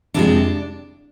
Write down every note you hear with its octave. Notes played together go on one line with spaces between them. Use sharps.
F2 C3 F3 G#3 D4